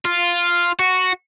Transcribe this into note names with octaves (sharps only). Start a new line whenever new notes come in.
F4
F#4